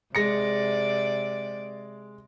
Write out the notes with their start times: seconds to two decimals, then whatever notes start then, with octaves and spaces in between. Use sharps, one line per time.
0.15 C3 G#3 D5 A#6 C#7